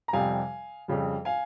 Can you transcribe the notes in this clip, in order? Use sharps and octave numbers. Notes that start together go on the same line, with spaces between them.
A#5
F2 C3 G3 F5 G#5
F2 C#3 G3
F5 G#5